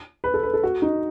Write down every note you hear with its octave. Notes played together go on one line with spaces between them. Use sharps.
B4
A4
B4
A4
F#4
D#4